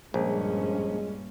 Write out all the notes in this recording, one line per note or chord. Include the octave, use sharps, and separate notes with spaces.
A#1 G2 A#2 G#3 C#4